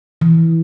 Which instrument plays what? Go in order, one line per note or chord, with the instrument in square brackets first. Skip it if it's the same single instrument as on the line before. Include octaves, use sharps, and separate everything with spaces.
[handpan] E3